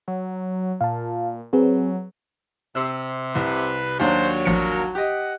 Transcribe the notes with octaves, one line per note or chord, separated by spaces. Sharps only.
F#3
A#2 F5 A5
F#3 C4 G#4 B4
C3 E6
C2 B4
D#2 F#3 D4 C5
A1 F3 A#4 C#7
G4 D#5 F#5